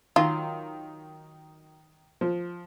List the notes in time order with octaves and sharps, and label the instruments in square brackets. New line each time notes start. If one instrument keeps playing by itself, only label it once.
[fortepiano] D#3 [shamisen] F#3 F4
[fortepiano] F3